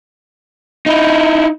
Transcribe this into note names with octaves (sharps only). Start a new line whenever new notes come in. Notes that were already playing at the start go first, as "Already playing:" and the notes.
D#4 E4